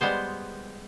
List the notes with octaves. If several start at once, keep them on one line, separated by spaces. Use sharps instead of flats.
G3 G#3 B3 C5